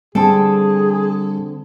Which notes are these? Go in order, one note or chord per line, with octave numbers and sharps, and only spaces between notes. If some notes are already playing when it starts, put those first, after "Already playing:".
D3 G3 C4 G#4 A4 G5 A5